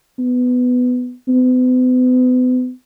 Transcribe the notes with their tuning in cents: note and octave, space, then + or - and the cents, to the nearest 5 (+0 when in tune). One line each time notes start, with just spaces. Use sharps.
B3 +10
B3 +40